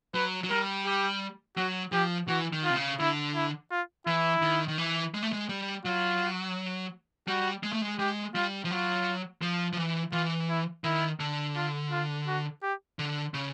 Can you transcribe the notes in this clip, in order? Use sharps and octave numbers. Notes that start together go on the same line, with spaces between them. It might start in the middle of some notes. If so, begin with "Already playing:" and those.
F#3 B4
F#3
G3 A#4
G4
F#3 F#4
F3 G4
E3 F#4
D#3
F4
C3
C#3
D3 E4
E4
F4
E3 E4
D#3
D#3
E3
G#3
A3
G#3
G3
F#3 F4
G3 F#4
G#3
A3
G#3
G#3 G4
G3 F4
F3
F#3 F4
F3
F3
E3
E3 F4
E4
D#3 E4
D3
F4
F4
F#4
G4
D3
C#3